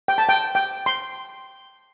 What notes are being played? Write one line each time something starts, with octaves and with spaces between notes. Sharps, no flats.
G5
A5
G5
G5
C6